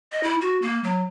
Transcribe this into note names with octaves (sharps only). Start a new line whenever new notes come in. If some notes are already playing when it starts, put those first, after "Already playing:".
D#5
E4
F#4
A#3
F#3